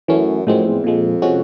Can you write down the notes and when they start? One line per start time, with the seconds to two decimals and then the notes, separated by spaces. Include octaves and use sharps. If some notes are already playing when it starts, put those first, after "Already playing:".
0.08 F#2 E3 A3 C#4
0.46 F#2 A2 F3 G#3 C4
0.66 E2
0.84 F2 A#2 F3 G#3
1.22 C3 F3 G#3 C#4 F#4